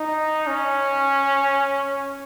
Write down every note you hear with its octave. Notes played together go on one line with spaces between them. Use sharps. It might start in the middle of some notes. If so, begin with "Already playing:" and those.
Already playing: D#4
C#4